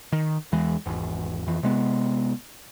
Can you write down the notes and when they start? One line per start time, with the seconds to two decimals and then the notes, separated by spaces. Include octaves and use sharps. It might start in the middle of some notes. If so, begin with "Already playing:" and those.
0.12 D#3
0.52 E2 E3 G#3
0.86 G#1 E2
1.46 F2 E3
1.63 C3 G#3 B3